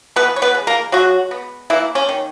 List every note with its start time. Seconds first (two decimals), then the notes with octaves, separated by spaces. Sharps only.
0.16 E3 B3 B4
0.36 C#5
0.42 B3 B4
0.54 G#3
0.67 A#3 A#4
0.92 F#3 G#3 F#4
1.31 B3
1.70 E3 A#3 E4
1.95 C#4
2.09 D#3